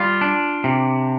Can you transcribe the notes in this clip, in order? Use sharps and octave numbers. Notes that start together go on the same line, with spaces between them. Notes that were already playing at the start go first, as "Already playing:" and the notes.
Already playing: G3 F4
D4
C3